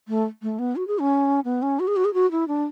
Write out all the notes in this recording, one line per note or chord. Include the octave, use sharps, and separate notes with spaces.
A3
A3
B3
F#4
G#4
C#4
B3
C#4
F#4
G#4
F#4
G#4
F#4
E4
D4